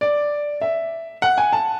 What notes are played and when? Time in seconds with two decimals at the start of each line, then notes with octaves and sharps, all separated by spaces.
0.01 D5
0.61 E5
1.22 F#5
1.38 G#5
1.53 A5